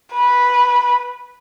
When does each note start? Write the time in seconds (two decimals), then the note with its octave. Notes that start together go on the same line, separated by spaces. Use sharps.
0.14 B4